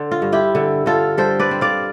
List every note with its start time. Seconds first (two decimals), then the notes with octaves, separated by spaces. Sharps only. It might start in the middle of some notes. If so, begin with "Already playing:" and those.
Already playing: D3 C5
0.11 F4
0.22 G2
0.32 E4 G4
0.55 D3
0.86 D3 F4 A4
1.17 G3 A4 C5
1.39 B4 D5
1.51 C4
1.61 D5 F5